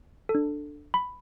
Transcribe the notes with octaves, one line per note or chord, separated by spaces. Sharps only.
A4
D4
B5